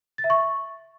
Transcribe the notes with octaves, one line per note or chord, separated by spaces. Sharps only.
A6
E5
C#6